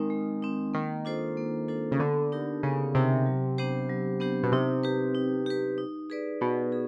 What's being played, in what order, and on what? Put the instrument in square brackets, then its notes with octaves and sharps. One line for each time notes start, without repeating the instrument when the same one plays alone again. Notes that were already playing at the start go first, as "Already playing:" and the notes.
Already playing: [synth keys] D#3 [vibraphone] G#3 C4 D#4
[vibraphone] G#3
C4 D#4
[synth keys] D#3 [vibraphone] A#3
[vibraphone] D4 F4 A4 C5
A#3
D4 F4 A4 C5
[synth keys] C#3
[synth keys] D3 [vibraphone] B3
[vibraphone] D#4 G4 A#4
[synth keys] C#3 [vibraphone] B3
[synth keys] C3 [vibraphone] D#4 G4 A#4
[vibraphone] F#3
B3 D4 G4 C5
F#3
B3 D4 G4 C5
[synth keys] B2
[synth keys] C3 [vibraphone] D#4
[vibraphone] G4 B4
D#4
G4 B4
D#4
G#4 B4 D5
[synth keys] B2 [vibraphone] D#4
[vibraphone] G#4